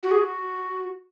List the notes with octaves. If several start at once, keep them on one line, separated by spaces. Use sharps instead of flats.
F#4
G#4
F#4